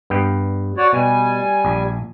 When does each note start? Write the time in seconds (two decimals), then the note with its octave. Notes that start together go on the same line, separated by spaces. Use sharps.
0.10 G2 B3 G5
0.77 F#4 C#5 D5
0.93 B2 G3 G#5
1.65 A#1